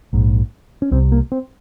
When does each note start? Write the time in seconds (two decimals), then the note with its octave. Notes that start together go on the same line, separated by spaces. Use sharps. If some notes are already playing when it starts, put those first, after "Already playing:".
0.13 A#1 G#2
0.82 C#4
0.91 C2 C3 C4
1.12 A#3
1.32 C4